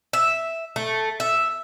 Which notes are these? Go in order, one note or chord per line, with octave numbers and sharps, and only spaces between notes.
E5
A3
E5